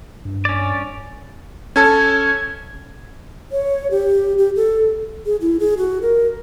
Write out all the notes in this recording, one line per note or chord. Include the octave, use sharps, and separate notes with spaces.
G2
C#4 D5
C#4 A4 A5 G#6
C#5
G4
G4
A4
G#4
E4
G#4
F#4
A#4